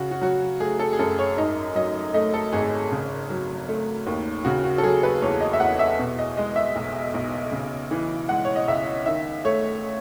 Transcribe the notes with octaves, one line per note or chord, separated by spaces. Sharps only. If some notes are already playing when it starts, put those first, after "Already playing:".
Already playing: C#3 F#4
F#4
F#3 F#4
A3 G#4
A4
G#4
F#2 A4
C#5
G#2 D#5
F#3 D#5
A3 D#5
A4
G#1 G#4
C#3
F#3
A3
D#2
C#3 F#4
F#4
A4
F#3 G#4
B4
E2 C#5
D#5
E5
E2 F#5
E5
B2
D#5
G#3 D#5
E5
B1
B1
C#3
E3
G#3 F#5
C#5
D#5
C#2 E5
D#3 E5
A3 C#5